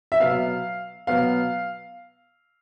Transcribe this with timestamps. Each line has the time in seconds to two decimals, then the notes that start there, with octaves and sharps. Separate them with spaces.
0.12 E5
0.20 B2 F#3 B3 F5
1.07 B2 F#3 B3 F5